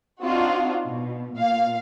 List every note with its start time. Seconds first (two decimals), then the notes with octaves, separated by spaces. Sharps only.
0.23 C4 D4 D#4 F4 F#4
0.86 B2
1.35 A#2 F5